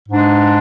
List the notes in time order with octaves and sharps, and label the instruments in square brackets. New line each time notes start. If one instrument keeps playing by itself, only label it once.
[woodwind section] G#2 G#3 D4